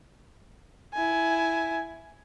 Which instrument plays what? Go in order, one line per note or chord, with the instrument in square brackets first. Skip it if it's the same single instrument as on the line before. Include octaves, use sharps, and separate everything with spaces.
[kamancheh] E4 G#5